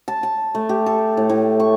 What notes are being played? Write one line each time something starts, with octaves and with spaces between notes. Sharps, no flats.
A5
A5
A3
G4
A4
A2
A2
C#6